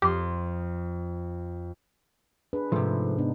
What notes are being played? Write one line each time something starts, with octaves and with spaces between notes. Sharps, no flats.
F2 G4 C6
D4 G#4 B4
G#2 C3 F3 A3
B3 D4 D#4